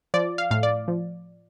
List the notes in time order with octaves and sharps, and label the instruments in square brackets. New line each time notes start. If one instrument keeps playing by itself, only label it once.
[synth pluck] F3 D5
F5
A2 F5
D5
F3